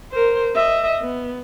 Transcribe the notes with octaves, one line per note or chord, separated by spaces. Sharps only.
A#4 C5
D#5 E5
B3